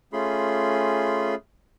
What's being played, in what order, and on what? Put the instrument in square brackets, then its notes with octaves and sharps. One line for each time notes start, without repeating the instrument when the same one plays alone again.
[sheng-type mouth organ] A3 C#4 F4 G#4 B5 C6